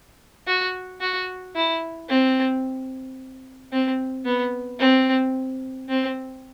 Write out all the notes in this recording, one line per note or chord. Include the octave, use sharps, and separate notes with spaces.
F#4
F#4
E4
C4
C4
B3
C4
C4